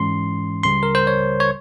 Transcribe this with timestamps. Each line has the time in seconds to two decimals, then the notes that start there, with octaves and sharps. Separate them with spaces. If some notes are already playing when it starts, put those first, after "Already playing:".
Already playing: G#2 E3 G#3 C#4 C6
0.63 C#2 C#3 G3 C6
0.83 A#4
0.95 C5
1.07 C#5
1.40 C#5